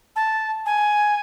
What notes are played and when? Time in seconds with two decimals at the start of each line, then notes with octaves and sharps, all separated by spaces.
0.16 A5
0.66 G#5